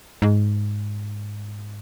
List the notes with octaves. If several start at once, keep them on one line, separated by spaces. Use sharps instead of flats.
G#2